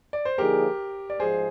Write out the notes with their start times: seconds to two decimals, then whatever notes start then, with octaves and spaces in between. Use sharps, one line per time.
0.13 D5
0.25 C5
0.38 D3 F3 A#3 D#4 G4 G#4 A#4
1.10 D5
1.19 G#2 F3 G#4 C5